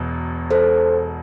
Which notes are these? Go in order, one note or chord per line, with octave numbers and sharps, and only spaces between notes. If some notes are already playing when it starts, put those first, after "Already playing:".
Already playing: E1 E2 B2
A4 C5